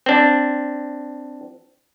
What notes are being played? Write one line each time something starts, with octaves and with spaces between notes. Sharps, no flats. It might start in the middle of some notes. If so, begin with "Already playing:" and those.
C4 D4